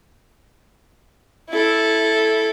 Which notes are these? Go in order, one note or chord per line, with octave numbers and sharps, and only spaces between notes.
E4 A4